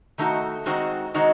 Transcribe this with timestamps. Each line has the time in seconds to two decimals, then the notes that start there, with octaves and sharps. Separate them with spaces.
0.18 D#3 A3 D#4 F#4
0.66 D#3 G#3 C4 D#4 F#4
1.14 D#3 G#3 C4 D#4 F#4